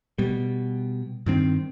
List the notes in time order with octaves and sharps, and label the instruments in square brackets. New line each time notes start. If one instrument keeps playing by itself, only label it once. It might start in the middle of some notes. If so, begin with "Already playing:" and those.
[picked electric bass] B2 G3
G2 D#3 C4